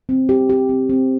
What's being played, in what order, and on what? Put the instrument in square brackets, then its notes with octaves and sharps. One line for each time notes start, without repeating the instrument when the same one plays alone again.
[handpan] C4
G4
G4
C4
C4